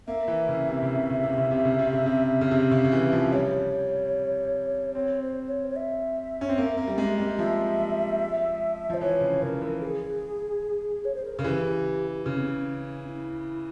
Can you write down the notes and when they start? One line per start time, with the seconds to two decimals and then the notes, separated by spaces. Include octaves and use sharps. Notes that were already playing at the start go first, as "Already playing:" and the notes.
0.07 A#3 E5
0.28 E3
0.48 C#3
0.68 C3
0.82 C#3
0.96 C3
1.10 C#3
1.24 C3
1.38 C#3
1.51 C3
1.65 C#3
1.79 C3
1.93 C#3
2.06 C3
2.41 C#3
2.51 C3
2.71 C#3
2.85 C#3
2.92 E3
3.12 F3
3.32 G3 C#5
4.95 C4 C#5
5.22 C5
5.49 C#5
5.70 C#5
5.76 E5
6.41 C#4
6.49 C4
6.58 A#3
6.77 A#3
6.87 G3
6.98 G#3
7.18 G3
7.39 F3 E5
8.90 F3 C5
9.01 E3 C#5
9.21 C#3
9.42 C#3 A#4
9.62 E3
9.82 G#4
11.05 C#5
11.15 C5
11.25 A#4
11.35 C#3 G#4
11.44 E3 G4
12.26 C#3 C#4
12.36 C4
12.45 C#4
13.07 E4